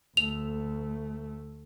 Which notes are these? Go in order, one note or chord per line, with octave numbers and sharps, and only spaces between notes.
D2 A3 F7